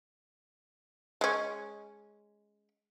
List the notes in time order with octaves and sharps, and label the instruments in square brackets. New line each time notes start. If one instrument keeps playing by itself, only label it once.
[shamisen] G#3 C#4